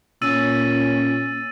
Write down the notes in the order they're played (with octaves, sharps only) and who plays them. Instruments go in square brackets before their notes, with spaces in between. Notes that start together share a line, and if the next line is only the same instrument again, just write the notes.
[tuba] A#2 [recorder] C#4 [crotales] E6 A6 D#7